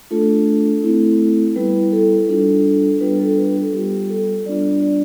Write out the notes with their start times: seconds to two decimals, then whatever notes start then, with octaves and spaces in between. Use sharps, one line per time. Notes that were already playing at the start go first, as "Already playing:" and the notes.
0.11 A3 D4 F4 A4
0.84 A3 C4 E4
1.56 G3 B3 E4 B4
1.92 A4
2.29 G3 D4 F4 A4
3.01 G3 B3 D4 F4 B4
3.20 A4
3.38 B4
3.56 A4
3.73 G3 B3 F4 G4
4.10 A4
4.46 G3 B3 D4 F4 D5
4.82 D5